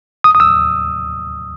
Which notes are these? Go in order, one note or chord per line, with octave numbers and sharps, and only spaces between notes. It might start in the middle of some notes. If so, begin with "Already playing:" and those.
D#6
D#6
E6